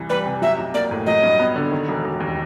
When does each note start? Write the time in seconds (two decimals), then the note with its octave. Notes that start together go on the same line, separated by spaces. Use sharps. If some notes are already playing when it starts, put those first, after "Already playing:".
Already playing: C2 E3
0.10 G3 B4
0.26 C3
0.42 F#3 E5
0.58 B1
0.74 A#3 D5
0.91 A2
1.06 F#3 D#5
1.23 G2
1.39 B3
1.56 D3
1.72 D#3
1.88 E1
2.04 E1
2.20 D#2